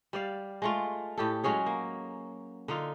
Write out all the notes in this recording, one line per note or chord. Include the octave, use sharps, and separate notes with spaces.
G3 D5 F5
G#3 A3 F4
A2 G4 A4
F#3 G#3 C#4 G#4
A#3
D3 D#4 F4